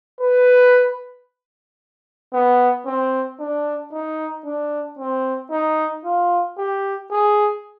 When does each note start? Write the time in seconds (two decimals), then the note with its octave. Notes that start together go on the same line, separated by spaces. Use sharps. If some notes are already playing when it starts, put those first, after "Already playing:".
0.20 B4
2.33 B3
2.86 C4
3.39 D4
3.92 D#4
4.45 D4
4.99 C4
5.51 D#4
6.05 F4
6.58 G4
7.11 G#4